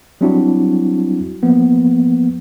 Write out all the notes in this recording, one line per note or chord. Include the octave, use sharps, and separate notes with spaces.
F#3 G3 C4 D4 E4 F#4
F3 A#3 B3